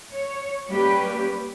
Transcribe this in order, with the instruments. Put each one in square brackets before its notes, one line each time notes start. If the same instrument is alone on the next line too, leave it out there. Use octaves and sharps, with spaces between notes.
[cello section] C#5
G3 A#3 C#4 G4 B4